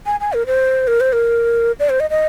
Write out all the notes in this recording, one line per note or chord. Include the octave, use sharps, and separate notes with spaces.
G#5
G#5
A#4
C5
A#4
C5
A#4
D5
C5
D#5
D#5